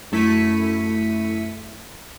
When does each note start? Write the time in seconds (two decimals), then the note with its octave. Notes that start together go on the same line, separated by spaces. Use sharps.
0.12 F#2 A3 E4 B6 C#7 D#7